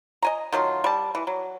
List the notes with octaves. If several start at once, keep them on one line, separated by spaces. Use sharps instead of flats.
D#5 G#5 A#5
D#3 F#3 A3 F4
G3 A5
E3
F#3